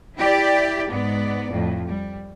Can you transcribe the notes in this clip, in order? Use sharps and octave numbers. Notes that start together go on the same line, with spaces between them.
E4 G4 D5
G#2 B3 D5
F2 A2
G3